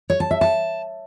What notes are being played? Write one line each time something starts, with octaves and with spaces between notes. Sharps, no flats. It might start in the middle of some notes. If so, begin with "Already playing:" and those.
C#5
A5
E5
A5